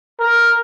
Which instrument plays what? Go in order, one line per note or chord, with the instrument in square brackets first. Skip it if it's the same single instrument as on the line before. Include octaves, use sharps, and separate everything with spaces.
[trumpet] A#4